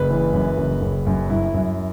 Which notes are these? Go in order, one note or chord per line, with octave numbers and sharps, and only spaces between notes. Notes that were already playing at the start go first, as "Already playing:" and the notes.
Already playing: F#1 B4
E3
F#2
F#1
F#1
F#2
F#2 E4
F#2